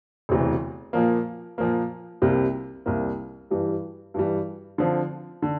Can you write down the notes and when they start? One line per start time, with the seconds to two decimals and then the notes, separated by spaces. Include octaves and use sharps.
0.29 E1 D2 C3 E3
0.93 A#2 F3 A#3
1.58 A#2 F3 A#3
2.22 C2 C3 G3 A#3
2.86 C2 C3 G3 A#3
3.51 G2 E3 G3
4.14 G2 E3 G3
4.78 D3 F3 C4
5.42 D3